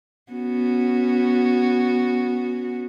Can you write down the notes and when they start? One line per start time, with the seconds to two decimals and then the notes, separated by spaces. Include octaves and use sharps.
0.32 B3 C#4 F#4